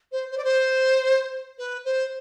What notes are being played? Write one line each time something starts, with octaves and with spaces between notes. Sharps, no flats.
C5
C5
D5
C5
B4
C5